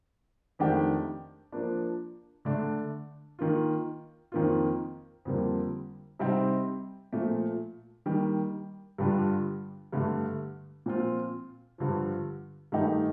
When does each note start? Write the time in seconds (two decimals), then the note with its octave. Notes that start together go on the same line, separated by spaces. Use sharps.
0.59 F2 D#3 A3 D4 G4
1.52 F3 A#3 D4
2.45 D3 A3 D4
3.39 D#3 A#3 F4
4.32 F2 D#3 A#3 F4
5.25 F2 D3 G3 A#3 F4
6.19 C3 G3 C4 D#4
7.13 A#2 F3 A3
8.06 D#3 G3 A#3
8.98 G2 D3 G3 D4 F4
9.92 G2 D3 A3
10.86 A#2 F3 C4 F4
11.78 G2 D3 F3
12.72 G2 D#3 A3 D#4 G4